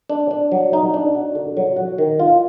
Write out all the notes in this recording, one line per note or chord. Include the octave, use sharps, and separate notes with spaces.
D4
D4
F#3
D#4
D4
F#4
D3
F#3
F#4
D#3
F4